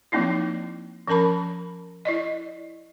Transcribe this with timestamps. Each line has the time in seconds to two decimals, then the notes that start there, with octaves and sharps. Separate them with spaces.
0.12 F3 F#3 A#3 C4 D#4 E4
1.07 F3 C#4 A#4 A5 B5
2.05 E4 D5 D#5